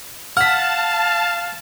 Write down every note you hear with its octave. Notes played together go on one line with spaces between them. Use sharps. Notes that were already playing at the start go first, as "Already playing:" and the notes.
F5 F#5 A5 F6 B6